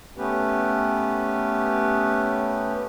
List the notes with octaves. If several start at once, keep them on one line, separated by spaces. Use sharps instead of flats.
A3 B3 C#4 G4 B4